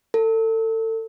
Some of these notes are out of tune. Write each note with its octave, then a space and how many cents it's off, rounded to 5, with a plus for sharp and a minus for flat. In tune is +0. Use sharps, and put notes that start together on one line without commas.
A4 +30